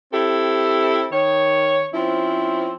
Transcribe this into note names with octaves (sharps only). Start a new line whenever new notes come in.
C4 E4 G4 A4
D#3 C#5
F3 C4 C#4 E4